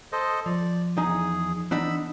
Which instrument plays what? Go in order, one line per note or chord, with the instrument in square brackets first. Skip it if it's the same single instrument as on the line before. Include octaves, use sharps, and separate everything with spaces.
[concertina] A4 C5 D#5
[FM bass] F3 [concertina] D5
[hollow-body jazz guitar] E2 D#4 G#5 [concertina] G#4
[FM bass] E3 [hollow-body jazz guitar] B3 D4 D#4 [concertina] B5 E6